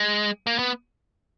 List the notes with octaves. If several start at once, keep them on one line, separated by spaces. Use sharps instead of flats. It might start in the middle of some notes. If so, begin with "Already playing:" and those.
Already playing: G#3
A#3
B3